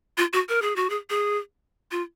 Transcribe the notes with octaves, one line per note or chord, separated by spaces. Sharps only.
F4
F#4
A#4
G#4
F#4
G#4
G#4
F4